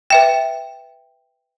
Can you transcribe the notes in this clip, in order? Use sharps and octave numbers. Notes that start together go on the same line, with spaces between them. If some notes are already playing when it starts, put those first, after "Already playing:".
B4 E5 G5